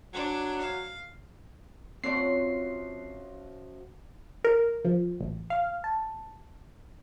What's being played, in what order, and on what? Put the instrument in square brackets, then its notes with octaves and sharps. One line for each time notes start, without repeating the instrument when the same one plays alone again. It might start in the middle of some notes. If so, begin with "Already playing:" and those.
[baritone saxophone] F#3 [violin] D4
[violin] F5
[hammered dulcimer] F#2 F3 F#4 [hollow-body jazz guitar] C4 C#5 D5 [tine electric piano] C7
[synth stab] A#4
F3
A1
F5
A5